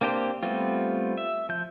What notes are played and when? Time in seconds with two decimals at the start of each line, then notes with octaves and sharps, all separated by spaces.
0.01 A#3 C4 D4 G4 C5
0.43 G3 A3 B3 C4 F4
1.17 E5
1.49 F3 G6